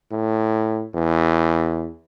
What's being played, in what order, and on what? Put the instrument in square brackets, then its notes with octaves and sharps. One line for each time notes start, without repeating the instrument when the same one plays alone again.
[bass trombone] A2
E2